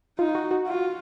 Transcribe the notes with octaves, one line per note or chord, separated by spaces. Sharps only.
D#4 F4
F#4
F#4
F4